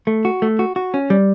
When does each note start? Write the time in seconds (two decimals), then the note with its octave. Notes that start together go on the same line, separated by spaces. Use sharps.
0.07 A3
0.25 F#4
0.42 A3
0.59 F#4
0.76 F#4
0.94 C#4
1.10 G3